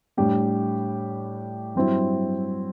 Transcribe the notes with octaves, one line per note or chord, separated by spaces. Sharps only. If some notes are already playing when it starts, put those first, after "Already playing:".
A2 G3 D4 G4
G2 F#3 C4 E4